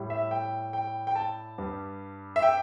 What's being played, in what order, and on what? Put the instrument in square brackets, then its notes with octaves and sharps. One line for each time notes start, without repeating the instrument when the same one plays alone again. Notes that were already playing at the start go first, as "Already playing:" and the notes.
Already playing: [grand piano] A2 G3
E5
G5
G5
G5
A5
G2 G3
E5
G5